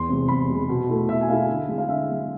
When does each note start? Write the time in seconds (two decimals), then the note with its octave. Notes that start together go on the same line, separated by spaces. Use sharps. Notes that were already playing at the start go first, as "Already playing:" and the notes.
Already playing: E2 C6
0.09 C3 G#3
0.28 E2 B5
0.48 C3 G#3
0.69 B2
0.89 A3 E4
1.09 B2 E5
1.21 G#5
1.29 A3 E4 F5
1.48 D3
1.69 G#3 C4
1.78 F5
1.88 D3 E5
2.08 G#3 C4